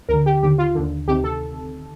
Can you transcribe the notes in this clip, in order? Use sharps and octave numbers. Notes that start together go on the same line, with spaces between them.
D2 D3 A#4
G4
D#2 D3 G4
F4
D#2 D3
D2 C3 D#3 G4
A4